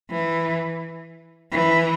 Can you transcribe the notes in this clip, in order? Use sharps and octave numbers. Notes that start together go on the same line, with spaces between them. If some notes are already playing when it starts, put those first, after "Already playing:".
E3
E3